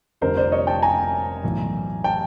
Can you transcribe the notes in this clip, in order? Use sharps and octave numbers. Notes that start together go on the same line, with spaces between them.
F1 F2 D3 G3 A#4 C5
C5 D5
C#5 D#5
G5 A5
G#5 A#5
B1 A2 E3
G5 A5